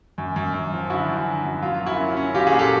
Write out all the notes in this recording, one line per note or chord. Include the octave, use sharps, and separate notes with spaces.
F#2
F#2
F#2
F3
D3 E4 F#4
F#2
D3
F#2
F#3 F4
F4
A#3
E4 F#4
C#4
C#4
F#3 F4 G4
F#4 G#4
A#2
G4 A4